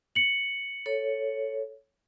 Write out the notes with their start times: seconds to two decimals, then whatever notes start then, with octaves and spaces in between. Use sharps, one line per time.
0.15 C#7 F#7
0.86 A4 C#5